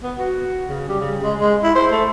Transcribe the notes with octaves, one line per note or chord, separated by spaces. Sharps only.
B3
F#4
C#3
G3
C#3
G#3
G#3
E4
C5
A3